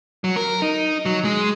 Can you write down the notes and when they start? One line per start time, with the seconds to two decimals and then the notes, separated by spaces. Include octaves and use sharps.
0.24 F#3
0.36 A#4
0.62 D#4
1.06 F#3
1.24 G#3